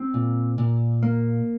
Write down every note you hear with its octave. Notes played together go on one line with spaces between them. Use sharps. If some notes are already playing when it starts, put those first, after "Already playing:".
Already playing: C4
A#2
A#2
A#3